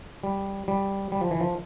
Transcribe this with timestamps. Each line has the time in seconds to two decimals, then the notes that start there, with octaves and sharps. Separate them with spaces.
0.23 G3
0.68 G3
1.12 G3
1.21 F3
1.31 E3
1.40 F3